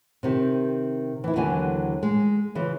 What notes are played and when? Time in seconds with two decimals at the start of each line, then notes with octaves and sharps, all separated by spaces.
0.23 C3 D#3 G4
1.24 E3 E4
1.36 D#2 D3 E3 F#3 E4 G#5
2.03 G#3
2.55 C#3 E3 F4